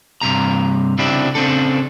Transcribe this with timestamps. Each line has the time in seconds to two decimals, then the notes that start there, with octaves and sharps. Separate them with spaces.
0.21 G2 C3 A#5
0.98 C#3 C4 D4 E4 G4
1.35 C#3 C4 D4 A4